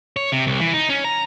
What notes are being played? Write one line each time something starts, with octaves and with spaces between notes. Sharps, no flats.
C#5
C3
C2
E3
D#4
C#4
A#5